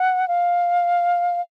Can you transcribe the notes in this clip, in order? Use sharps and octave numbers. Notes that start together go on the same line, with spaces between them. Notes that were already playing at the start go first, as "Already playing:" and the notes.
Already playing: F#5
F5